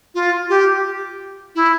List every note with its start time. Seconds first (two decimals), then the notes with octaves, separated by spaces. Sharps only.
0.15 F4
0.49 G4
1.55 E4